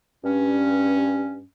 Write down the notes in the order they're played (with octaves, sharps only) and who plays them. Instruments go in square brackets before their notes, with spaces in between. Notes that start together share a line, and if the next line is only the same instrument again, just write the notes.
[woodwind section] G2 C#4